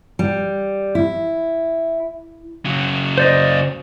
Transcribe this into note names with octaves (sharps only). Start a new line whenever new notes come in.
G3
E4
C#3 F#3
C5 D5 D#5